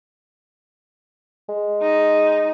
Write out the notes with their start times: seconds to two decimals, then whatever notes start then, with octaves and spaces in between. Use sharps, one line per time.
1.49 G#3
1.82 D#4